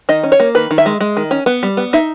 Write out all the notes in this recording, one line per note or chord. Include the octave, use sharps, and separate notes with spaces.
D#3 D#5
C#4
C#5
A#3
D#3 B4
D#3
E5
G#3
G#3
D#3
C#4
B3
G3
B3
D#4 E5